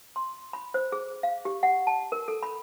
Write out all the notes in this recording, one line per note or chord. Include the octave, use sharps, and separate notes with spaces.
C6
B5
C5
G#4
F5
G4
F#5
A5
A#4
A4
B5